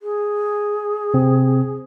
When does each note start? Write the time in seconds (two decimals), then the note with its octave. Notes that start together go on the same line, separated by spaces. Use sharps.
0.02 G#4
1.14 C3 C4